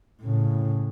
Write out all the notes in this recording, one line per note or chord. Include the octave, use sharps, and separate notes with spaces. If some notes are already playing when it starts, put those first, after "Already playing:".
A2 C#3